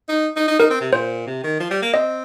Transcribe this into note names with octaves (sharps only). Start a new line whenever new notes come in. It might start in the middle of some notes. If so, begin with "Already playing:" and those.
D#4
D#4
D#4
D#4 A#4
C4
C3
A#2 C5
C3
D#3
F3
G3
A#3
C4 D#5